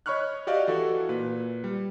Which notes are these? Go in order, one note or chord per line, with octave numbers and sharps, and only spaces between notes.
C#5 D#5 B5 C#6 F6 F#6
F#4 G4 D5 D#5 F5
E3 F#4 A4
A#2 B4
G3